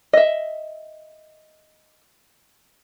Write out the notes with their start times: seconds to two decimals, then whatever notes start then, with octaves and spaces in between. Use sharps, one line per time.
0.13 D#5 E5